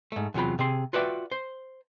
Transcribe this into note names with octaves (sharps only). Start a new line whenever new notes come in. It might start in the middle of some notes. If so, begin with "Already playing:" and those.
G#2 A3
E2 C3 F#3 F4 B5
C3 G#4 C6
F4 F#4 B4 D5 E5 G5
C5